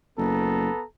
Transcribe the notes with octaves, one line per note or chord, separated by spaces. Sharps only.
F#1 B3 A4 A#5